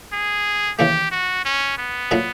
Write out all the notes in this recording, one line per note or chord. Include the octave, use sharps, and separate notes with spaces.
G#4
D#2 C#3 E3 A3 G4
F#4
C#4
B3
A#2 F#3 A3 D4